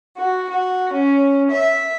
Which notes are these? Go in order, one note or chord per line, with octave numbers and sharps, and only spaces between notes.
F#4
F#4
C#4
E5